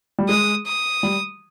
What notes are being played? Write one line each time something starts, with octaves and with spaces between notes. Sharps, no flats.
G3
G#3 D#6
D#6
G3